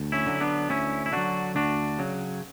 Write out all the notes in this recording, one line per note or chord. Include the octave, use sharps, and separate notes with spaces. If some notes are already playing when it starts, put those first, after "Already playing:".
Already playing: D2
C#4 E4
D3 F#3
B3 D4
D2 C#4 E4
E4
D3 F#3 D4 F#4
D2 D4 F#4
C#3 F#3